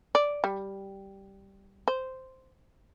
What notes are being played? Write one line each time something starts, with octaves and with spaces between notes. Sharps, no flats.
D5
G3
C5